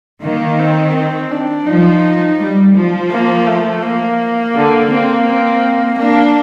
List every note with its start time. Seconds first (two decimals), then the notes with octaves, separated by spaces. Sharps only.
0.23 D#3 A#3
0.59 C4
0.95 C4
1.31 D4
1.67 F3 D#4
2.39 G3
2.74 F3
3.11 A#3
3.47 A3
3.83 A#3
4.55 D3
4.90 C4
5.26 C4
5.98 A#3 D4